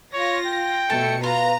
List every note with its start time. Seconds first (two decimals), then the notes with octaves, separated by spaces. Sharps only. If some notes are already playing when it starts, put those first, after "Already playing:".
0.13 F4 C#5 A#6
0.46 G5
0.90 B2 A3 A5 C#7
1.24 F4 B4 A#5